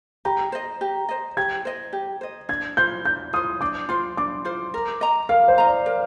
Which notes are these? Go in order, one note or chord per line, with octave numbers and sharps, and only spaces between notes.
G4 A#5
C5 D#5
G4
C5 D#5
G4 G#6
C5 D#5
G4
C5 D#5
D4 G#6
F4 C5 G6
D4 G6
F4 C5 D#6
D4 D6
F4 C5 C6
D4 D6
F4 C5
A#4
D#5 A#5
A#4 F5
C5
D#5 A#5
D5
A#4